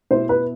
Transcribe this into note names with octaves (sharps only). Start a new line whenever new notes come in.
B2 B3 E4 C5
B4